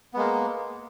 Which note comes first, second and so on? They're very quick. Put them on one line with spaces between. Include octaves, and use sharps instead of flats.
B3 G#3 A#3